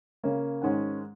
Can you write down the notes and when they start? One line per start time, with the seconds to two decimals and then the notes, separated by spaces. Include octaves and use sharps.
0.24 C#3 A#3 C#4
0.62 G#2 D#3 G#3 C#4 F#5